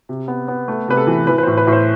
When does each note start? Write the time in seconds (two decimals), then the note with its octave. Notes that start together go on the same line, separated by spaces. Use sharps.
0.09 C3
0.28 B3
0.48 B3
0.68 A3
0.88 C3 B4
0.97 A4
1.07 E3
1.27 E3 B4
1.38 B4
1.43 A2 C5
1.57 B4
1.67 A2
1.72 C5